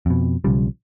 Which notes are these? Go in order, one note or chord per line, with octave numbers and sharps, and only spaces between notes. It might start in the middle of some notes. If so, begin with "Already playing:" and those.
F2 B2
B1 C#3 F3 G3